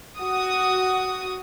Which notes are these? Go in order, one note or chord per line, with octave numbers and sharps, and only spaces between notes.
F#4 D#6